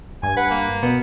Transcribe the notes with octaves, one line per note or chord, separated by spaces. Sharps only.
G2 G#5
B4 F#5
A#3
B2 B3